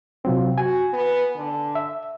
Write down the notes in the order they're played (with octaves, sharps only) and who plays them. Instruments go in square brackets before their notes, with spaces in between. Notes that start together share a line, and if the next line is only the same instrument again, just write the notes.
[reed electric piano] C3 F#3 C4 [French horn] F4
[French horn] F#4 [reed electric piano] G#5
[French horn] B3
D3
[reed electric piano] E5